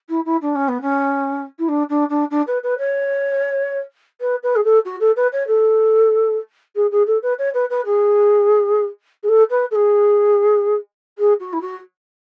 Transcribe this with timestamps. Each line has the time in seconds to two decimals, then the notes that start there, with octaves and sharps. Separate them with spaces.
0.09 E4
0.25 E4
0.42 D4
0.55 C#4
0.68 B3
0.81 C#4
1.59 E4
1.68 D4
1.89 D4
2.09 D4
2.31 D4
2.47 B4
2.63 B4
2.78 C#5
4.21 B4
4.43 B4
4.56 G#4
4.64 A4
4.85 F#4
5.00 A4
5.16 B4
5.32 C#5
5.47 A4
6.75 G#4
6.91 G#4
7.07 A4
7.22 B4
7.39 C#5
7.54 B4
7.70 B4
7.86 G#4
9.23 G#4
9.28 A4
9.50 B4
9.71 A4
9.75 G#4
11.18 G#4
11.40 F#4
11.53 E4
11.61 F#4